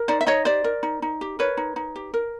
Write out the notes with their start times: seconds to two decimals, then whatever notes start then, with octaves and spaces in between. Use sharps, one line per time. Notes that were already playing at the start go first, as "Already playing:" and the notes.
Already playing: A#4
0.08 D#4 C5 D5
0.21 E5
0.26 D#4 C#5 D#5
0.45 G4 C5 D5
0.64 A#4
0.83 D#4
1.02 D#4
1.21 G4
1.39 A#4 B4 C#5
1.57 D#4
1.76 D#4
1.96 G4
2.14 A#4